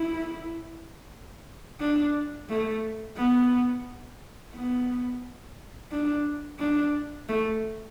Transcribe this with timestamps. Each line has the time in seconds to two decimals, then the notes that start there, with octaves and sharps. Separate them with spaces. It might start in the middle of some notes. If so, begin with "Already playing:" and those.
Already playing: E4
1.80 D4
2.49 A3
3.17 B3
4.54 B3
5.91 D4
6.59 D4
7.28 A3